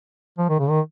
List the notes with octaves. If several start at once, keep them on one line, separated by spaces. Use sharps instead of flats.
F3
D#3
C#3
D#3